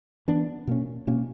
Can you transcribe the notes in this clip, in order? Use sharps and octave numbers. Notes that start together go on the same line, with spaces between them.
E3 B3 D4
B2 A#3 C#4
B2 A#3 C#4